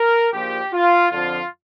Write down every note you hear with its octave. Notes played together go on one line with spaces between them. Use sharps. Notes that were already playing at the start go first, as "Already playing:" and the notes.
Already playing: A#4
A#1 A#2 F3 G4
F4
F2 D3 F3 F4